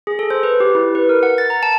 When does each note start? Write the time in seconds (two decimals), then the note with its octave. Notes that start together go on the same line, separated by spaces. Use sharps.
0.07 G#4
0.19 A4
0.30 C5
0.43 B4
0.60 G4
0.75 E4
0.95 B4
1.09 A#4
1.23 F#5
1.38 A6
1.50 A#5
1.63 A5